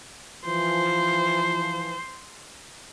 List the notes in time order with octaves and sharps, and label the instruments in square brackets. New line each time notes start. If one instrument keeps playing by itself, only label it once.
[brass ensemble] E3 F3 [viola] C5